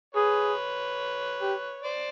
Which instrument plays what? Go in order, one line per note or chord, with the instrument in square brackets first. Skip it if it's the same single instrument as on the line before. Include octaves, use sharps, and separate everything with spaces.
[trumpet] G#4 [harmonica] B4 C#5
[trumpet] G4
[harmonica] C5 D5